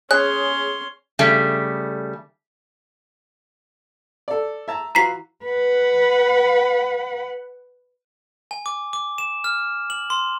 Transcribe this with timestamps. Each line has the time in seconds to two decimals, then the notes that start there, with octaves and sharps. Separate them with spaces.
0.11 C#4 G#4 C#5 C6 F#6
1.19 C#3 G3 A3
4.28 A4 D5
4.68 E5 A5 A#5
4.95 E3 F4 F#4 A#5 B6 C7
5.45 B4 F#5
8.51 G#5
8.66 D6
8.93 D6
9.18 E7
9.44 F6
9.90 F#7
10.10 C6